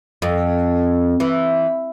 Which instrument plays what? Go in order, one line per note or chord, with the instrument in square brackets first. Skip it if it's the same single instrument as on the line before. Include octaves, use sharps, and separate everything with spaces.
[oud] F2
E3